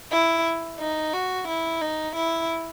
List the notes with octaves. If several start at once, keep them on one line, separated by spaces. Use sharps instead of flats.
E4
D#4
F#4
E4
D#4
E4